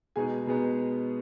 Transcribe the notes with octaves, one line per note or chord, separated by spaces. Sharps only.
B2 G#3 B3 D#4 G#4 G#5
B2 G#3 B3 D#4